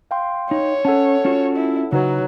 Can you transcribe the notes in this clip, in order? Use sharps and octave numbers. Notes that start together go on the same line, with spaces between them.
F5 G5 C6
D#4 C#5
C#4 A4 F#5 A5
C#4 F4 F#4
E4
C#3 F#3 D#4 B4 C#5